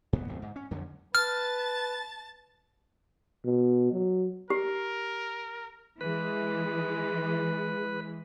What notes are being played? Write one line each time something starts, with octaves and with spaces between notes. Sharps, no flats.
G2 B3
D1 F2
G#2
C#4
F2 D3 F#3
B4 A5 F6 A6
B2
F#3
G4 A#4
E3 G#3 B4